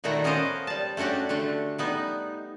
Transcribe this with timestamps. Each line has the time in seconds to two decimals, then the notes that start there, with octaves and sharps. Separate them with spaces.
0.04 A#2 D#3 A3 E4 F#4 A#5
0.24 B3 C#4 A#4 C5 D#5 F5
0.67 G3 A5
0.97 A3 C#4 D4 F#4 G4
1.29 D3 A3 D4
1.78 G3 B3 D#4